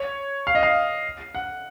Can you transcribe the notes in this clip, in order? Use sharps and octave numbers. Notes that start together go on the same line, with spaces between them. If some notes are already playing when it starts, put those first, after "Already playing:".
Already playing: C#5
F5
D#5
F5
F#5